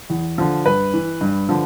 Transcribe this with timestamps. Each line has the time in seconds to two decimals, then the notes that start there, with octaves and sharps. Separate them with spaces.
0.10 E2
0.38 D3 F3
0.66 G2 B4
0.94 E3
1.21 G2
1.49 D3 F3